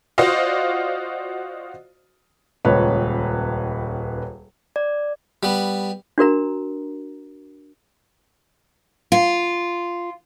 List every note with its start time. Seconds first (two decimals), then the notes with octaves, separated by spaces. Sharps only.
0.18 F4 F#4 C5 D5 D#5 F5
2.65 D#1 C#2 B4 C#5
4.76 D5
5.43 G3 B3
6.18 D4 F#4 A#4 A#5
9.12 F4